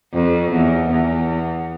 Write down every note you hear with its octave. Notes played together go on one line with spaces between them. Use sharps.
F2
E2
E2